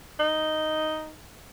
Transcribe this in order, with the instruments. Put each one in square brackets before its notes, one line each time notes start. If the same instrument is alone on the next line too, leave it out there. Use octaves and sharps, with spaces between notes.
[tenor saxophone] D#4